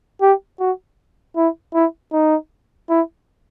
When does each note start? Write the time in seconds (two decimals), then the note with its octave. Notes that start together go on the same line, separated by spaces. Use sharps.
0.21 G4
0.60 F#4
1.37 E4
1.74 E4
2.12 D#4
2.90 E4